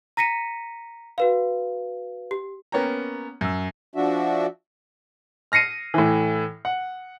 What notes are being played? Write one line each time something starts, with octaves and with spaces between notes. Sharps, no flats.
A#5 A#6 B6 C#7 D#7
F#4 B4 F5
G4
A#3 B3 C#4 C#5 G5 A#5
F#2 E6
F3 D4 F#4 E5
F6 A#6 C7 C#7 D#7
A2 E3
F#5